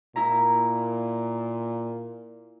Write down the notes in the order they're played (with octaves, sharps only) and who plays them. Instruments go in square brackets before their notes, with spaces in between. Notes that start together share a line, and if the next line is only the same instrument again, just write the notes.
[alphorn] A#2 [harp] E4 A#5